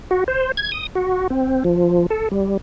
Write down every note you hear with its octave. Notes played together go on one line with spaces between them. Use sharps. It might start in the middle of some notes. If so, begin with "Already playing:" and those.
F#4
C5
G#6
D#6
F#4
C4
F3
A4
G3